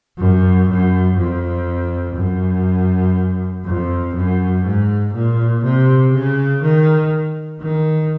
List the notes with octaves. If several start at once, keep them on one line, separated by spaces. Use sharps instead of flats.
F#2
F#2
F2
F#2
F2
F#2
G#2
A#2
C3
C#3
D#3
D#3